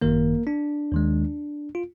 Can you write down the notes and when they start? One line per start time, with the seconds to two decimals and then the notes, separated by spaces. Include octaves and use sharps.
0.02 G#1 F#2 D#3 A#3 A#4
0.47 D4
0.92 D#2 D#3 G#3
1.75 F4